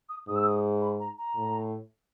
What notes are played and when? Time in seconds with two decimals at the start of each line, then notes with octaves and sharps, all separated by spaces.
0.09 D#6
0.28 G#2 D#6
0.35 E6
0.43 D#6
0.81 B5
0.99 A#5
1.18 A#5
1.35 A2